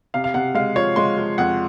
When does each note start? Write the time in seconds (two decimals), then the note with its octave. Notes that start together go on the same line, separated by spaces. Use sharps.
0.14 C3 F5
0.24 F5
0.34 C3 F#5
0.55 G#3 F5
0.76 F3 C#5
0.96 G#3 C6
1.18 F3
1.38 F2 F#5